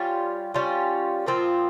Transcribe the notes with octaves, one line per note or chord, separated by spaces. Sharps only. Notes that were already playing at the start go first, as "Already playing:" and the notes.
Already playing: G3 C#4 F4
G3 C#4 F4
A#2 F3 C4 F4